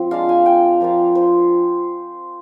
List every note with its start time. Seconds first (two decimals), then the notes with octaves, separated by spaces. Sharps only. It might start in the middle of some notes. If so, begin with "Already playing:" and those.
Already playing: F3 C4
0.11 G#3 D4 F4 F5
0.29 G#5
0.46 G5
0.80 F3 A#3 F4
1.15 C5